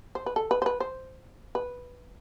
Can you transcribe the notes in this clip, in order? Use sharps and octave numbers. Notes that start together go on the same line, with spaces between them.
C5
B4
A4
B4
C5
B4
C5
B4